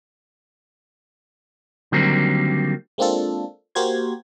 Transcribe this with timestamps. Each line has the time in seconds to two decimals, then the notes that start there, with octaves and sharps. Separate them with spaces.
1.92 D3 D#3 F#3 G3 A#3 C4
2.98 G#3 A#3 C4 D4 F4 A4
3.75 A#3 F#4 G4 A#4 C5 G#6